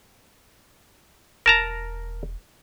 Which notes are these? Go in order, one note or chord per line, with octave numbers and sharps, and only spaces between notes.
E1 A#4 A5 A#5